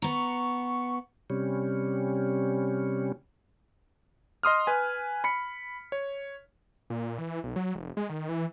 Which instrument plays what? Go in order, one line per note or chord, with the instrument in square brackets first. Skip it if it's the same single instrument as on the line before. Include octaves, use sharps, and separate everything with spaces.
[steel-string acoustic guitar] B3 A#5 [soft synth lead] C#6
[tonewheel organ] C3 G3 C#4
[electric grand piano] D#5 C6 D#6 F6
B4 G#5
B5 B6 C#7
C#5
[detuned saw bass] A#2
E3
B1
F#3
F1
G#3
D#3
E3